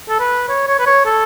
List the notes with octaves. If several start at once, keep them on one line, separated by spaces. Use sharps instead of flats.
A4
B4
C#5
C#5
B4
C#5
A4